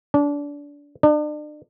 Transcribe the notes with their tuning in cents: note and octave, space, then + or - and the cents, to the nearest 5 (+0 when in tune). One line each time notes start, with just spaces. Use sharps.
D4 -25
D4 +40